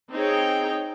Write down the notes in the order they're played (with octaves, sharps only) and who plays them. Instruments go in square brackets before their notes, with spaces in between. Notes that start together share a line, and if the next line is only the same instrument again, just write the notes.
[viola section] C4 D#4 G#4 C#5 G5